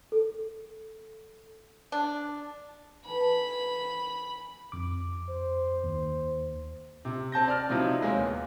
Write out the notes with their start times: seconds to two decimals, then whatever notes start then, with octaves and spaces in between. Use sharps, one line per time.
0.12 A4
1.92 D4
3.05 E3 A4 B5
4.72 F2 D6
5.30 C5
5.84 D#2
7.05 C3
7.32 C4 A5 G6 A#6
7.48 D5 A5 F6 A6
7.69 C3 F3 F#3 C4 D#4 E4
8.02 G#3 A#3 C#5
8.18 E2